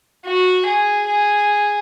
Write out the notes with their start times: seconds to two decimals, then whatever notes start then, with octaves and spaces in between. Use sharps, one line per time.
0.25 F#4
0.66 G#4
1.06 G#4